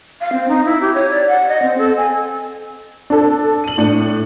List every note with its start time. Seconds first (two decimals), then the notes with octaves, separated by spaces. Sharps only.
0.21 F5
0.33 C4
0.49 D#4
0.65 E4
0.81 G4
0.94 C#5
1.10 D5
1.28 F#5
1.48 D#5
1.63 C4
1.78 A4
1.97 G#5
3.10 D4 A4
3.64 D#7 F#7
3.78 A2 D4 C#7